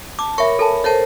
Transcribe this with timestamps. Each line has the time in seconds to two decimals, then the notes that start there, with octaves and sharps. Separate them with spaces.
0.19 A5 D6
0.38 A#4 C#5 E5 B5 C#6
0.59 A4 G#5 A5
0.84 A4 A#4 C5 C#5 A5